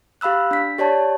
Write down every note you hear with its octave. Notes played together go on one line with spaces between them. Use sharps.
G4 F5 B5 E6 F#6
D4 B6
G4 C#5 D5 A5